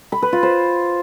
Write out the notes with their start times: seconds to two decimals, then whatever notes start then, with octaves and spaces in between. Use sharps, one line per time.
0.12 B5
0.22 B4
0.33 F4
0.43 C5